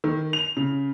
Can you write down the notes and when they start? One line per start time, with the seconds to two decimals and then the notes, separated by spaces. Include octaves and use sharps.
0.04 D#3
0.33 F7
0.57 C#3